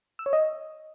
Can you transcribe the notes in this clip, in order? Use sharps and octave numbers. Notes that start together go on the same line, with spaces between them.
E6
C#5
D#5